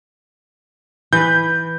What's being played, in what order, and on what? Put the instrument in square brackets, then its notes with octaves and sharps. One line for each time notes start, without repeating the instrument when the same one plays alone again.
[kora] E3 B4 [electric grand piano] G6